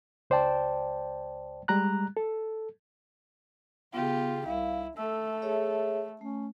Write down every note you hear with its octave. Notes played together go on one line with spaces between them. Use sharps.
C#2 C5 D5 G5 A5
G3 G#3 A#5 F#6
A4
C#3 B3 F4 G4
C2 E4 F5
A3 A4 E6
G#4 C#5 E5
A3 C#4